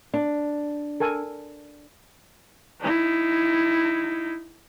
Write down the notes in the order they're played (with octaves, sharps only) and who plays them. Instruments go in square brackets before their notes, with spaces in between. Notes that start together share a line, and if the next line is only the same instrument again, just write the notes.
[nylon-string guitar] D4
[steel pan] A4 A#4 G#5
[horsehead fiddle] D#4 E4